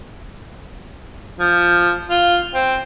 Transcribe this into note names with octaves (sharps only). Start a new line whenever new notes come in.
F3
F4
C4